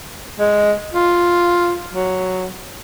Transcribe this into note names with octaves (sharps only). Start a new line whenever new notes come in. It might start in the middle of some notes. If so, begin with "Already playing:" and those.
G#3
F4
F#3